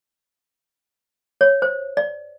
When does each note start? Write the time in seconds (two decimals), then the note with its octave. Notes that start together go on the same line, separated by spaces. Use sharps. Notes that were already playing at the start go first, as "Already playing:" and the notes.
1.41 C#5
1.62 C5
1.97 D5